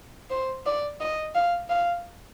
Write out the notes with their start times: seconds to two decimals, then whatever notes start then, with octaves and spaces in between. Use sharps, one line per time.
0.30 C5
0.66 D5
1.00 D#5
1.35 F5
1.70 F5